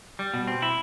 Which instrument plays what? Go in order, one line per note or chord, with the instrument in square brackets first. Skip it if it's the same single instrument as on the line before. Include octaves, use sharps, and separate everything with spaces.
[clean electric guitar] G3
B2
C4
E4